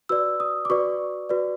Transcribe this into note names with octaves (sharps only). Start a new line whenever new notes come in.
F#4 B4 D5 E6
D#6
D6
F#4 B4 D5 C#6
F#4 B4 D5